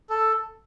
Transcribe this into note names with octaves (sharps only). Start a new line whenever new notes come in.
A4